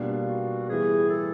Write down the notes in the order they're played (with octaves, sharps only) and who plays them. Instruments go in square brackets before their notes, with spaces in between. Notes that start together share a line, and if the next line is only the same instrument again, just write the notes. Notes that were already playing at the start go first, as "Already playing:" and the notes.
Already playing: [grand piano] B2 G3 A#3 D4 F4
[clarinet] F#4
[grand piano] A2 E3 G3 B3 [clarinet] G#4
[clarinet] A4